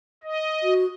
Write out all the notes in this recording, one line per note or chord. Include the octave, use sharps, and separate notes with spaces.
D#5
F#4